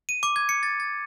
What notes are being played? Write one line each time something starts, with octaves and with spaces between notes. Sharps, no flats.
D#7
D6
G#6
C#7
A6
A6